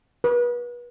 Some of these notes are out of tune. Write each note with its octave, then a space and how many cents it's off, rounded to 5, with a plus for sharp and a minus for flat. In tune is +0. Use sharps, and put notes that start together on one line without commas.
B4 -35